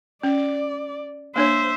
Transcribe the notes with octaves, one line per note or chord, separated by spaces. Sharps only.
C#4 D5
A#3 D4 C5 C#5 E5